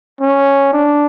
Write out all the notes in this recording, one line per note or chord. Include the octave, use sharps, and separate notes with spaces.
C#4
D4